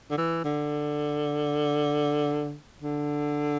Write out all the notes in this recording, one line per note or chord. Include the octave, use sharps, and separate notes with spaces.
D3
E3
D3
D3